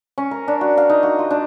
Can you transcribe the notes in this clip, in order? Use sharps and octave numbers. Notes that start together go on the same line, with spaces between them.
C#4
A#4
D4
F#4
F5
D#4
F#4
F4
D4